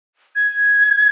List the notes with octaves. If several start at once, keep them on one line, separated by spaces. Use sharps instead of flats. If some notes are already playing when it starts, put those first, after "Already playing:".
G#6